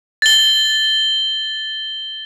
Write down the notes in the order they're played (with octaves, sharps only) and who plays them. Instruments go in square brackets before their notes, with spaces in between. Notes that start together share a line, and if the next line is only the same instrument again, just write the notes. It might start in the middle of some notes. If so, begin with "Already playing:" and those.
[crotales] A6 G7